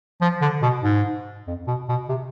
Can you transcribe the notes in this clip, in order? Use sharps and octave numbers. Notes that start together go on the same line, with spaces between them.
F3
D3
B2
G#2
F2
B2
B2
C3